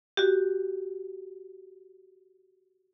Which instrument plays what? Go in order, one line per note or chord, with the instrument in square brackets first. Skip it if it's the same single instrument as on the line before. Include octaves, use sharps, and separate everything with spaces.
[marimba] F#4 G4